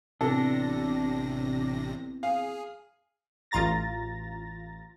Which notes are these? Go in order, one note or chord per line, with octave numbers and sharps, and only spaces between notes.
A1 C3 B3 C4 D4 E4 A4 A#6
G#4 F5
A1 F4 A#5 A6 A#6